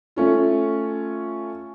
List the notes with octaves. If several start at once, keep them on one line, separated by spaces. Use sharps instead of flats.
A3 C#4 F4